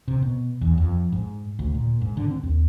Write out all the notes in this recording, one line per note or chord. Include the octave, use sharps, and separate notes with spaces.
C3
B2
E2
F2
G#2
D2
A#2
G#2
D3
C4
D#2